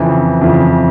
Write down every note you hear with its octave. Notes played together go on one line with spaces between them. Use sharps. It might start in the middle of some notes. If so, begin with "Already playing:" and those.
Already playing: F2 C#3 E3
F2 C#3 E3